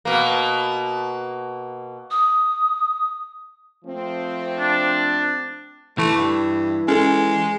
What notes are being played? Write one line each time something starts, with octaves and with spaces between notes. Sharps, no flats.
B2 A#3
D#6
F3 A3 C4
D4
E3 A3
G2
G#3 C#4 A4